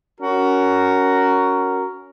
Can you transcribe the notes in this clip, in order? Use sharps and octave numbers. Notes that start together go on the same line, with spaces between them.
C#4 F#4 A#4